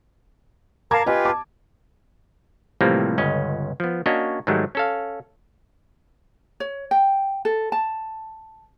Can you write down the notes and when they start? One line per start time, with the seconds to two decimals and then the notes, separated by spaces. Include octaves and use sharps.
0.91 A#4 F5 A5 A#5 D6 G#6
1.06 F4 G4 B4 D#5 G5 G#5
1.25 A5 D6
2.81 A2 C3 E3 F3 G3 A#3
3.18 G1 C#2 C#4 D#5
3.80 F3 B3
4.06 A#3 C#4 D4 F#4 C#5 D#5
4.47 G#2 D#3 F#3 G3 A3
4.75 C#4 A4 F5
6.60 C#5
6.91 G5
7.45 A4
7.72 A5